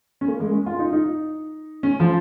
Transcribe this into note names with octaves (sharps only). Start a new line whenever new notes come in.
C#4
A#3
G#3
C#4
F4
D#4
D#4
C#4
F3